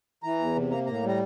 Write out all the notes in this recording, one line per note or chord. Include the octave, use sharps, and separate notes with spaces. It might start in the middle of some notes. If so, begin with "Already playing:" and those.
E3 A#5
E2
C3
A#3 A#5
A2 A#5
G3
A#5